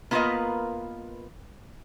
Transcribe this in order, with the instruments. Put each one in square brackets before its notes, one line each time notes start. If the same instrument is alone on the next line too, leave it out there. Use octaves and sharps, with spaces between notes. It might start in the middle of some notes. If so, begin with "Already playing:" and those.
[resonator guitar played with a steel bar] A#3 B3 F4 A#4 B4 D#5